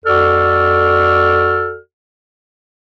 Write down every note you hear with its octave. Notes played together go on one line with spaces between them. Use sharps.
F2 F#4 A4 D5 F6